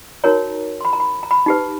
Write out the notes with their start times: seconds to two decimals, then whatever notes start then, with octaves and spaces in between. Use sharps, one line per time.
0.24 D#4 F#4 A#4 C#5 A#5
0.81 C6
0.85 B5
0.93 A#5
1.00 B5
1.23 A#5
1.31 B5
1.46 D#4 G4 B4